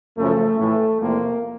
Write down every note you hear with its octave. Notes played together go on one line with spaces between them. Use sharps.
F#2 C#3 F3 A3
A2 E3 A3
E2 C3 F3 A#3